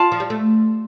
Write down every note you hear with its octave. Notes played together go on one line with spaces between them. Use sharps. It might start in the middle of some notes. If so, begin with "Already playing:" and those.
Already playing: F4 D5 A5
F3
G3
A3